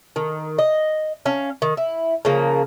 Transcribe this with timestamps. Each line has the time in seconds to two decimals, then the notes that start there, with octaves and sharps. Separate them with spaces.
0.16 D#3
0.59 D#5
1.26 C#4 F5
1.62 D#3
1.77 E4
2.25 C#3 F3 A#3